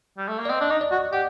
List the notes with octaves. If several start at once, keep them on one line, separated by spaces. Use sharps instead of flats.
G3
A3
A#3
D5
C4 D#5
D4
D#4
D5
F#4
G4 F#5